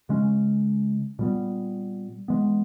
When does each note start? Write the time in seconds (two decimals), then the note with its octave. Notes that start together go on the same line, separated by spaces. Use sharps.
0.09 C#3 G#3 C#4
1.19 A#2 G3 B3
2.28 E3 G#3 B3